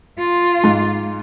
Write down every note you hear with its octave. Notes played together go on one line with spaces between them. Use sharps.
F4
G#2